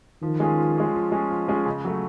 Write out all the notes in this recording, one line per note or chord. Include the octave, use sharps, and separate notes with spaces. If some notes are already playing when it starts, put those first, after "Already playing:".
D#3 F3
G#3 C#4 F4 G#4
F3
G#3 C#4 F4 G#4
F3
G#3 C#4 F4 G#4
F3
G#3 C#4 F4 G#4
C#3
F#3 A3